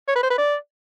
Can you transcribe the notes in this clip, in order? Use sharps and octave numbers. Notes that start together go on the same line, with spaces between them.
C#5
B4
C5
B4
D5